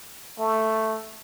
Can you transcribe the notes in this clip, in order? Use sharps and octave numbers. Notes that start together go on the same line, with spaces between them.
A3